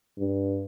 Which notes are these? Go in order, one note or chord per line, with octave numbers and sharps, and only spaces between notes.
G2